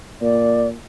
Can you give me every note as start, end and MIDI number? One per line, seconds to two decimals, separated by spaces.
0.22 0.75 46
0.22 0.68 74